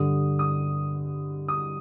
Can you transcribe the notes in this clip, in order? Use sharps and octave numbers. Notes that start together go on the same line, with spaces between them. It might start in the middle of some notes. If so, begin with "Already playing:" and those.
Already playing: G2 D3 G3 D#6
D#6
D#6